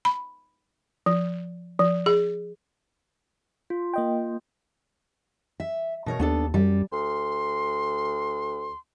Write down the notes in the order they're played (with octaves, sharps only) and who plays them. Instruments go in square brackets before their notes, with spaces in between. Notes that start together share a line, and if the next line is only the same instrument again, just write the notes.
[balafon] B5
F3
F3
G#4
[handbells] F4
[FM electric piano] A#3 D#5 G5
[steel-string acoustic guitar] E5
B2 A#4 C#5
[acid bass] D#2 [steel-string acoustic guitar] B3 D4 A4
[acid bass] F#2 [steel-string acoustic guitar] G3
[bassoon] D2 [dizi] C6